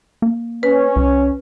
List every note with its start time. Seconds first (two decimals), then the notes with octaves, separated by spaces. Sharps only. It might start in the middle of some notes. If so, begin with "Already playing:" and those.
0.22 A#3
0.63 C#4 B4
0.96 C2